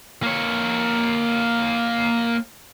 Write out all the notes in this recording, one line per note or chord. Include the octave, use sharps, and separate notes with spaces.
A#3 C#5